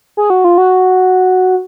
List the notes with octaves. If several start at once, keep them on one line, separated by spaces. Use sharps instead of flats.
G#4
F#4
F4
F#4